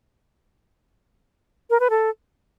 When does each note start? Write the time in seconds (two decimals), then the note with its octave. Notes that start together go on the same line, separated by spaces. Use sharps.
1.70 A#4
1.80 B4
1.90 A4